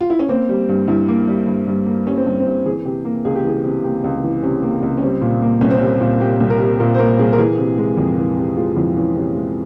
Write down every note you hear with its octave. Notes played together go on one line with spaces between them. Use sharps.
F4
E4
C#4
A#3 C4
G3
G2
G2 E4
A#3
G3
G2
G2
A#3
G3 C#4
C4
G2
C4
G2
E3 G#4
C3 G4
A#3
C#2 G#4
G4
E3 G#4
C3
A#3 G4
C#2
E3
C3 C#4
A#3
C#2
C#4
G3 C4
A#2
A#3
C2 C#4
C4
G3 C#4
A#2
A#3 G4
C2
A#4
G3
A#2 A#4
C5
A#3 A#4
C2 G#4
A#4
E3 G#4
C3
G#3
F2
E3
C3
G#3 F4
F2 E4
E3 C#4
C3 C#4
G#3